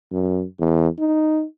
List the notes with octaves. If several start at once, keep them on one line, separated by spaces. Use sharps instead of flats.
F#2
E2
D#4